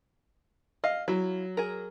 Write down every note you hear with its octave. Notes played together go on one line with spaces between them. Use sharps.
D#5 F5
F#3 E4 F4
G#4 A#4